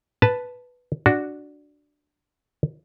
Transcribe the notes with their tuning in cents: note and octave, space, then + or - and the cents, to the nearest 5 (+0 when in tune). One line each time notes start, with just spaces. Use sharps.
B4 +0 A5 +0
D4 +0 F#4 +0